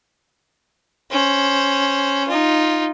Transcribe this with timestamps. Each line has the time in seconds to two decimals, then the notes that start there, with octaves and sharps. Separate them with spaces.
1.11 C#4 C5
2.28 D#4 F4